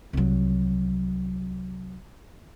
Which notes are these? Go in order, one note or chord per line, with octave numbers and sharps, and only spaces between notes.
C2 F#3